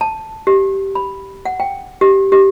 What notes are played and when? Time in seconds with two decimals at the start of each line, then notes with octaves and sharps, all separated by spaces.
0.01 A5
0.47 G4
0.95 B5
1.45 F#5
1.60 G5
2.01 G4
2.32 G4